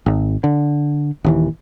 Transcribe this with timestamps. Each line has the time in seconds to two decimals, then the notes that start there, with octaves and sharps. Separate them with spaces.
0.06 G#1
0.44 D3
1.24 D#1 D#2 E3